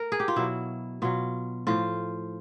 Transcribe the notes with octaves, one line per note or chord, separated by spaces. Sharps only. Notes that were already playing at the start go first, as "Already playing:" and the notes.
Already playing: A#4
G#4
G4
F4
B2 F#3 E4
B2 F#3 F4
A2 F3 F4